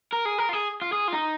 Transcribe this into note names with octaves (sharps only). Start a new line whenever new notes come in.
A#4
G#4
A#4
F4
G#4
F4
G#4
F4
D#4